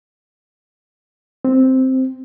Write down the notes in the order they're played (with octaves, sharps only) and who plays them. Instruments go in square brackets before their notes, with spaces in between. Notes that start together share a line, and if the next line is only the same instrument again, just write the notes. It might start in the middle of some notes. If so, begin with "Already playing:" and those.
[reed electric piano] C4